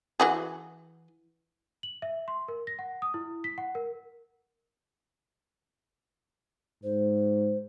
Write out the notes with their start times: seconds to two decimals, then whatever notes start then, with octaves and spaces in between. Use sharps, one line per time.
0.20 E3 F#4 G#4
1.83 F#7
2.02 E5
2.28 C6
2.48 A#4
2.67 A#6
2.79 F#5
3.02 D#6
3.14 E4
3.44 B6
3.58 F#5
3.75 A#4
6.83 G#2 C5